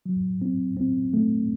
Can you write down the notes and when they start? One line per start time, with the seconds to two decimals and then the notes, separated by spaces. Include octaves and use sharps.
0.06 F#3
0.42 C4
0.77 C4
1.14 A3